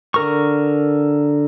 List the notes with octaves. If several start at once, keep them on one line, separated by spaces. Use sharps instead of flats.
D3 A#4 C#6